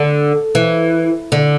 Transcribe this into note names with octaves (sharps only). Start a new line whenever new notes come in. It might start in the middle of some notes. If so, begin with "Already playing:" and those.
Already playing: D3
E3
D3